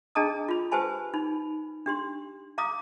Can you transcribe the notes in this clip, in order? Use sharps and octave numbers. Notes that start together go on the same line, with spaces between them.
D4 G#4 D#5 A5 A#5 D#6
F4 B5
G4 B4 C5 G#5 A5 B5
D#4 B5
D4 G4 C6
F5 A#5 D6 D#6